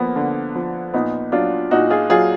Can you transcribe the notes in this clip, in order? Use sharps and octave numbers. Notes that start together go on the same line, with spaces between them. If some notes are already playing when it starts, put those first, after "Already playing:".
Already playing: D3 F3 A#3 B3
D3
F3
A#2 B3 D#4
F#3 D4 F4
A#2 D#4 F#4
F4 G#4
F#3 F4 G#4